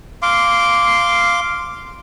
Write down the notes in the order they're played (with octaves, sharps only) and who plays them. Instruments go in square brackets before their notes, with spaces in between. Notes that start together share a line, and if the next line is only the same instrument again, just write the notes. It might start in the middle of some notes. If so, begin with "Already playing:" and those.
[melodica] F5 C6 D6